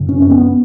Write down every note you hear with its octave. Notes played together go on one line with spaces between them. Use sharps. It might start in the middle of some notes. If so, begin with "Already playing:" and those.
Already playing: F#2 C#3
C#4
C#4
B3